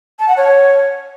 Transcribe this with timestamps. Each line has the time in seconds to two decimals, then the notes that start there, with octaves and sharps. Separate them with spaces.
0.19 A5
0.28 F#5
0.37 C#5